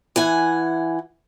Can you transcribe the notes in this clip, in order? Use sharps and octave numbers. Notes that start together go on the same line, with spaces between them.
E3 F#5 G#5